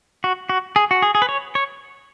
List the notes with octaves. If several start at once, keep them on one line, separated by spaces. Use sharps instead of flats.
F#4
F#4
G#4
F#4
G#4
G#4
B4
C#5
C#5